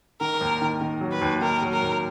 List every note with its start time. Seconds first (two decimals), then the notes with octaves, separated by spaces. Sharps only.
0.21 D#3 A#4
0.41 D#2
0.62 D#3
0.81 D#3
1.01 F#3
1.12 B4
1.21 D#2
1.41 D#3 A#4
1.62 F#3
1.73 A#4
1.83 D#2